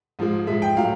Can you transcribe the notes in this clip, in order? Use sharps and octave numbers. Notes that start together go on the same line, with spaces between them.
G#2 F3 G#3
G#2 F3 G#3 E5
G5
A2 F#3 F5